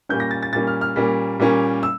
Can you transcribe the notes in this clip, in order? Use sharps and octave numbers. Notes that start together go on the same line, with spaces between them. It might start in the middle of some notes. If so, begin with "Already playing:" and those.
A#2 G3 A#3 C#4 G6
A#6
A6
A6
A#2 G3 A#3 C#4 A6
F6
F6
A#2 G3 A#3 C#4
A#2 G3 A#3 C#4
E6